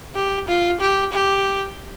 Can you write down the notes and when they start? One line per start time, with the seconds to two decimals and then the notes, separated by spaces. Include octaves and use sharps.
0.15 G4
0.48 F4
0.81 G4
1.13 G4